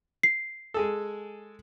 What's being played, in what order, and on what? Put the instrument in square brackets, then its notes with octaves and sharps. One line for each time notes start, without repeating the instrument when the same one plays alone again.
[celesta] C7
[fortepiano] G#3 G#4 A4